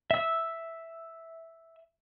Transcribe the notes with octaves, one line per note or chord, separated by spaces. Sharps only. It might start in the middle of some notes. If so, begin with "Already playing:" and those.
E5 E6